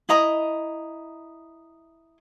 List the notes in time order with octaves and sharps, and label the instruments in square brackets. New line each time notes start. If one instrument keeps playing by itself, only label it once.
[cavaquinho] E4 D#5 A#5 D#6